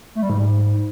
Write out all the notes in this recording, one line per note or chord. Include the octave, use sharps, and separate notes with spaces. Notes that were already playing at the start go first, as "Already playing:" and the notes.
A3
G3
G#2